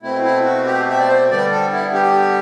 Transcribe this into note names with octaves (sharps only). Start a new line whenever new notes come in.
B2 A3 C4 E4
E4
F#4
G4
E5
D5
C5
D3 G3 B3 D5
A4
E4
G4